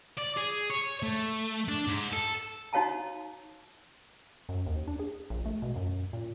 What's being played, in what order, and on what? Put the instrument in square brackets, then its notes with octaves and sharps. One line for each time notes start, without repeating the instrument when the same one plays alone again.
[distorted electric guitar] D5
G#4
C#5
A3
D4
G#2
A4
[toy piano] D#4 F#4 C#5 F5 A5 A#5
[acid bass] F#2
D#2
D4
G#4
A#1
A3
B2
F#2
A#2